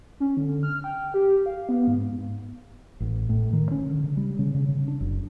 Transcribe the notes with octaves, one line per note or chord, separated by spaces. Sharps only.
C#4
D3
F6
G5
G4
F5
B3
G#2
A1
A2
D#3
C#4
D3
C#3
G3
C#3
C#3
C#3
D4
F#1